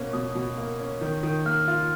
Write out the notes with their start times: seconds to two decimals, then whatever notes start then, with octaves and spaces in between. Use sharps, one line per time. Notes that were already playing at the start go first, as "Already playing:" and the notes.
Already playing: B2 A#3 C#4
0.13 B2 D#6
0.35 B2
0.58 A#3
0.79 C#4
1.01 D#3
1.23 D#3
1.45 A#3 F6
1.67 F4